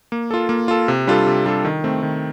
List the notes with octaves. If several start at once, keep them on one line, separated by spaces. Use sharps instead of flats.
A#3
F4 A4
A#3
F4 A4
C3
G3 D4 F4 A4
C3
G3 D4 F4 A4
D#3
A3 C4
D#3